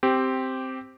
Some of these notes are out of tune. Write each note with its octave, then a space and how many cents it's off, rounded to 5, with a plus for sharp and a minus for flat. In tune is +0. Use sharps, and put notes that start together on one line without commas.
C4 +0 G4 -5